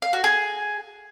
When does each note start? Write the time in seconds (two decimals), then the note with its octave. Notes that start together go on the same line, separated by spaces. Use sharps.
0.02 F5
0.13 F#4
0.24 G#4